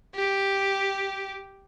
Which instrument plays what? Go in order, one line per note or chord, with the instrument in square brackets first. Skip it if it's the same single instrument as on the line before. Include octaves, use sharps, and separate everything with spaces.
[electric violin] G4